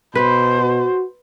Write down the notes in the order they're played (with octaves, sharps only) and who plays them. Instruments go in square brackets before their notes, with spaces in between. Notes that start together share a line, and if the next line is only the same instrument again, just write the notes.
[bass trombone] B2 [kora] B4 [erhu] C5
[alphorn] F#4